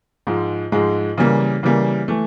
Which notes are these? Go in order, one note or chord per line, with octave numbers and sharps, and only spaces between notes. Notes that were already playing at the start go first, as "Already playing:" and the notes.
G#2 F3 G#3
G#2 F3 G#3
C#3 E3 G3 A#3
C#3 E3 G3 A#3
E3 A3